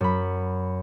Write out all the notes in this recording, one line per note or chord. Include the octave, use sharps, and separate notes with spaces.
F#2 B5